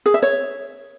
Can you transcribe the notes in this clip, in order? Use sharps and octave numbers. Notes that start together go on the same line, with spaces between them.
G#4
E5
C#5